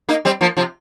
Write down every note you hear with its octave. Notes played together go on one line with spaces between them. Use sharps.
A#3 D#4
G3 C4
F3 A#3
C3 F3